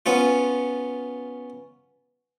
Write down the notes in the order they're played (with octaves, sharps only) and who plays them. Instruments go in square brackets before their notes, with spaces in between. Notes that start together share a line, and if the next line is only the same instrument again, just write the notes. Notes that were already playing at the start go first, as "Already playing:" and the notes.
[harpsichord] B3 C#4 F4